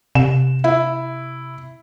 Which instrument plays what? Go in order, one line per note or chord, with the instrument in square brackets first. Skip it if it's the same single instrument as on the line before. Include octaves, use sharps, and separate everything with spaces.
[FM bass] C3 [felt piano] E7
[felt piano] E4